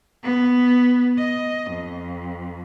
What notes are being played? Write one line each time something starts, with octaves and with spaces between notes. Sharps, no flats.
B3
D#5
F2